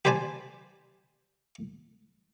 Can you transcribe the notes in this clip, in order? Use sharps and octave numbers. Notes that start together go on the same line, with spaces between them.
G4 B4 C5 D5 G#5 A5